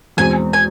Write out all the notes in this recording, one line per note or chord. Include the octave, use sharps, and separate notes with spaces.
E2 B2 G#3 C4 G#5
G#5